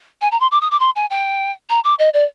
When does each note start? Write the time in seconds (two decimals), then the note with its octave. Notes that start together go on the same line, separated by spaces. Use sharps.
0.22 G#5
0.32 A#5
0.40 C6
0.51 D6
0.61 D#6
0.71 D6
0.80 C6
0.96 G#5
1.10 G5
1.70 A#5
1.84 D6
1.99 D#5
2.14 D5